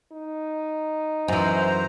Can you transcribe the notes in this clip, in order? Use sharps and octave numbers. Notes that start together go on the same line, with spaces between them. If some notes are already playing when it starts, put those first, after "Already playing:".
D#4
F#2 E3 C5 A#5